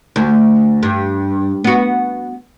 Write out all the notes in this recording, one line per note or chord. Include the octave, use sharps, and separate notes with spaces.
D2
G2
B3 F#4